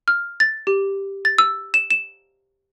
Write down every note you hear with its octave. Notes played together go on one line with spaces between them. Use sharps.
F6
A6
G4
A6
E6
E7
E7